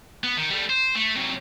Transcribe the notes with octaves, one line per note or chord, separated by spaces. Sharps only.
B3
D#3
G3 A3
C5
A3
C3 F#3